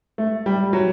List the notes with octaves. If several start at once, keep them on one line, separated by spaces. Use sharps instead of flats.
A3
G3
F#3